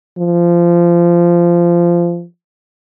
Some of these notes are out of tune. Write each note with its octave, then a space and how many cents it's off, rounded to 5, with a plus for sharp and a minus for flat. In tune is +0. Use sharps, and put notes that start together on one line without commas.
F3 -20